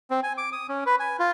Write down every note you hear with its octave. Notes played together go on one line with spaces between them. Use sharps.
C4
G#5
D6
D#6
C#4
B4
G#5
F4